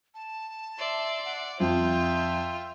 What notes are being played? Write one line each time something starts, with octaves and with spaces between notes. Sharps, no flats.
A5
D5 E5 C6
F#5
F2 F4 E5 G5